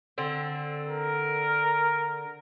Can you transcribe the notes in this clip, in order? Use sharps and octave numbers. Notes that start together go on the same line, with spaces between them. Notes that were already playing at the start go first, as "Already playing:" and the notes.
D3 C4
A#4